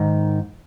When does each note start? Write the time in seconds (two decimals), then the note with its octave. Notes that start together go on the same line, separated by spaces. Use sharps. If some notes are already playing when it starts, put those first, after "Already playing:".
Already playing: G#2 D#3